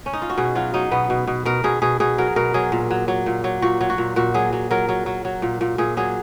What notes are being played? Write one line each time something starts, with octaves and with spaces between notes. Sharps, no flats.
C#4
D#4
F4
F#4
B2 G#4
F#3 F4
F#3 D#4
B2 B3
B2
B2
B2 A#4
B2 G#4
B2 G#4
B2 G#4
F#3 A#4
B2 A#4
F#3 G#4
A#2
F#3
F#3
A#2
F#3
A#2 F#4
F#3
F#4
A#2
A#2 F#4
F#3 G#4
F#3
F#3 A#4
F#3
F#3
F#3
A#2
A#2
A#2 G#4
F#3 G#4